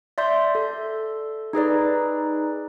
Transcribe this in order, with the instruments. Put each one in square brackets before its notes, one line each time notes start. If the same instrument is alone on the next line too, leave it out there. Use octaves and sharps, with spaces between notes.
[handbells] D5 E5 C6 G6
A4
D#4 G#4 B4 D5